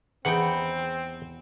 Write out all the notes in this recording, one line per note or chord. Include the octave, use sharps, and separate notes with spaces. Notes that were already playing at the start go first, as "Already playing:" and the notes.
E2 E3 C4 D#4 F#5 G5